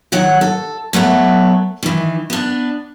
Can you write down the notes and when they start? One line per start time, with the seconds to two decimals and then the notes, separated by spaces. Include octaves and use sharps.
0.12 D#3 F#3 C#5 F#5
0.41 A4
0.93 F#3 A3 B3 A4
1.83 D#3 E3
2.30 B3 D4